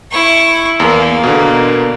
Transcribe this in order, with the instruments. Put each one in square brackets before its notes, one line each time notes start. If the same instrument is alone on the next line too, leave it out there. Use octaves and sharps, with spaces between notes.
[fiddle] E4 C#6
[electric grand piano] E2 [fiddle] A#3
[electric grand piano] B2 D3